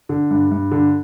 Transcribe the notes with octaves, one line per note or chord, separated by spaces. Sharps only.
D3
G2
G2
D3